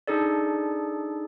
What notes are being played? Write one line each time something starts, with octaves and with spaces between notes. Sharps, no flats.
D4 D#4 G#4 A4 D5